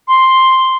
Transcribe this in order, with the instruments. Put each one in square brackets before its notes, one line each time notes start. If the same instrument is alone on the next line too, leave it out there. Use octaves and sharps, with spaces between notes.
[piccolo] C6